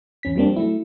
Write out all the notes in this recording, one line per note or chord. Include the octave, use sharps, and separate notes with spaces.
E2 C#4 B6
F3 G3 A#3 C4 D4
F#3 A3 E4